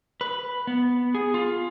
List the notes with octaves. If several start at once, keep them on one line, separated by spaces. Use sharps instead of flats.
B4
B3
G#4
F4